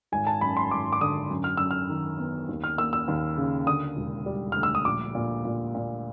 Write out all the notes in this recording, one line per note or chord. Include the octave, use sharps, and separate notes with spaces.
G#1 G#5
A5
F#2 B5
C6
G#1 D6
D6
D3 D#6
F#2
F6
F#2 E6
F6
D#3
B3
D#2
F6
A#3 E6
E6
D#2
C#3
D3 D#6
E1
G3
D2 F6
E6
D#6
A#1 D6
A#2
A#2
A#2